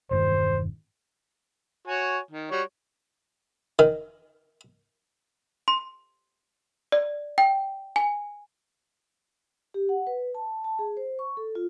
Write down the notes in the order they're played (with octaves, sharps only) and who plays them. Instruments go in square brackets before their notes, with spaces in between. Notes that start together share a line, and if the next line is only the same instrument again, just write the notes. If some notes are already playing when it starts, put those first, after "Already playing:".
[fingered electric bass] E1 G2 D#3 [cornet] C5
[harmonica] F#4 C#5 G#5
D#3
G3 F#4 C#5
[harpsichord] D#3
[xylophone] C6
D5
G5
G#5
[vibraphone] G4
F#5
B4
A5
A5
G#4
C5
C#6
A4
F4